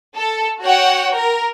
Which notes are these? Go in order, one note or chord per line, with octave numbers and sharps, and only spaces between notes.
A4
F#4 C#5 F#5 G5
A#4